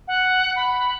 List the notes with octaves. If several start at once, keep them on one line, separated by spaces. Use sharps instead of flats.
F#5
B5